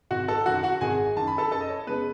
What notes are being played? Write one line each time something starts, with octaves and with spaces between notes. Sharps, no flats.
G#1 F#4 F#5
A4 A5
F#2 D#3 F#4 F#5
F#4 F#5
G#1 G#4 G#5
F#2 D#3 A5
B5
A4 A5
F#2 A4 A5
D#5
C#5
C#3 G#3 B3 B4